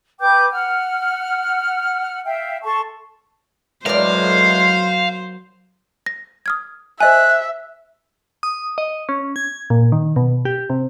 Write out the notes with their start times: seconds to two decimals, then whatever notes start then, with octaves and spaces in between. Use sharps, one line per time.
0.21 B4 G5 D6 G6
0.52 F#5 F6
2.25 E5 F5 G5
2.63 A4 A5 C6 C#6
3.86 E2 A2 F#3 G#3 A#4 C5 D5 F5
6.06 A#6
6.46 D#6 F6 G#6
7.01 C5 D#5 E5 G#5 F#6
8.43 D#6
8.78 D#5
9.09 C#4
9.36 G#6
9.70 A#2
9.92 D#3
10.16 B2
10.45 G4
10.70 C3